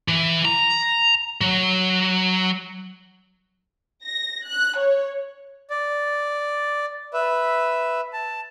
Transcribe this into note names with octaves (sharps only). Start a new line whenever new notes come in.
E3
A#5
F#3
A#6
F#6
C#5
D5
B4 E5
A5